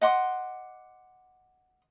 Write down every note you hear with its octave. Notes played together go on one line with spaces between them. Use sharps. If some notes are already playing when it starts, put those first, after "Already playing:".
D#5 F#5 C6 D6